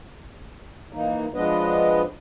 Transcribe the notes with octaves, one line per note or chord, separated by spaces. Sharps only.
E3 A#3 D#4
F3 G#3 B3 D4 B4 D#5